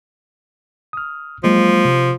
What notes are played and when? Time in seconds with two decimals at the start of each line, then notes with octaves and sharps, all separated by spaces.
0.93 D#6 F6
1.44 F3 F#3 G#3 A#3
1.85 C3